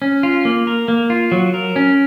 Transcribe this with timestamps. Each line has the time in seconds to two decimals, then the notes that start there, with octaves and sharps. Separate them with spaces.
0.02 C#4
0.23 F4
0.45 A#3
0.67 A#4
0.88 A#3
1.10 F4
1.32 F#3
1.54 A#4
1.76 C#4